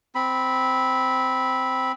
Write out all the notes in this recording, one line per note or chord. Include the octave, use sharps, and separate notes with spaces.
C4 B5